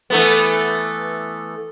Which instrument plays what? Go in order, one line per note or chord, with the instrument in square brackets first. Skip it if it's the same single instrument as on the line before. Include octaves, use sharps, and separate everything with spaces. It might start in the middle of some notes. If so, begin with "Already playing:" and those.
[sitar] E3 A3 B3